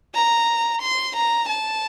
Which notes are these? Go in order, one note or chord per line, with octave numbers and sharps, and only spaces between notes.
A#5
C6
A#5
A5